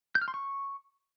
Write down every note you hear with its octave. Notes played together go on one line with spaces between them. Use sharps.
G6
F6
C6
C#6